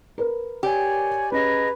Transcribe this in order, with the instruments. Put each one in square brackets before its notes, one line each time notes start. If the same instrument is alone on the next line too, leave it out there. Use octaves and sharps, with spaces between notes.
[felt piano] A#4 B4
[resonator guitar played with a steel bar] G4 [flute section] C#5 D5 G#5
[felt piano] C#4 [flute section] G#4 D#5 A#5 [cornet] B4